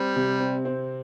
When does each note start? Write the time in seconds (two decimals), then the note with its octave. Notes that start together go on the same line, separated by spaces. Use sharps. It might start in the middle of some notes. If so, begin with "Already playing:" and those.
Already playing: G3 C4
0.16 C3
0.40 C4
0.65 C4